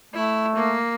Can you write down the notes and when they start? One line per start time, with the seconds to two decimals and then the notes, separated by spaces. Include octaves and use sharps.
0.14 A3 E4
0.55 A#3